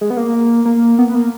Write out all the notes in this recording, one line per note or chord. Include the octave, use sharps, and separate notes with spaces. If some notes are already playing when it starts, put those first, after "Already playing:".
G#3
B3
A#3
A#3
B3
A#3